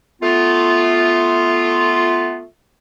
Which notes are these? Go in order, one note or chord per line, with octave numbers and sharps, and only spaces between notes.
A3 B3 F4